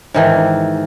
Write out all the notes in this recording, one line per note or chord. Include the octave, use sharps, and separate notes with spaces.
G#2 D#3 E3